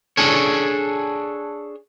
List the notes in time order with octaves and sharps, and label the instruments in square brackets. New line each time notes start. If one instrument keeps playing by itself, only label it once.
[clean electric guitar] D4 G#4 A4 C#5